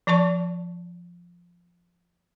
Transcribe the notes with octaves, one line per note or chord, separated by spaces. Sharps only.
F3 D5 A5 C#6